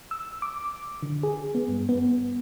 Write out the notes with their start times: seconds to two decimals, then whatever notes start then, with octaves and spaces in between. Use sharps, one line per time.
0.11 E6
0.42 D6
1.02 D3
1.23 G#4
1.55 B3
1.68 G2
1.89 B3